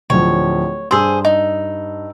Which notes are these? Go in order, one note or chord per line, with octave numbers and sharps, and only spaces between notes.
D1 F3 C#5
G2 G#4 C5 E6
D#4